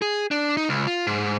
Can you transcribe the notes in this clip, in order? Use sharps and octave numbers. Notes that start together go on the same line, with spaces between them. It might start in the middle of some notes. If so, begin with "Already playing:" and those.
G#4
D4
D#4
C#2
F4
G#2